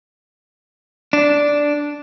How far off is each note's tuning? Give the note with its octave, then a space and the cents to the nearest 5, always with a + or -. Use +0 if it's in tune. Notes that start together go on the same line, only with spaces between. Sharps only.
D4 -5